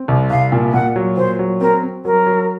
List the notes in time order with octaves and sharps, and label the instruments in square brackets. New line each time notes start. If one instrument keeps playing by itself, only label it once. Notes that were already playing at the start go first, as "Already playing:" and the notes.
Already playing: [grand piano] C4
C2
[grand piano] C2 [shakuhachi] F5
[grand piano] A#2
[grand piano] A#2 [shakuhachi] F#5
[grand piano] F#3
[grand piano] A#2 [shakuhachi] C5
[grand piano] F#3
[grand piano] C4 [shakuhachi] A#4
[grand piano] C4
[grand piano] F#3 [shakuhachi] A#4
[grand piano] F#3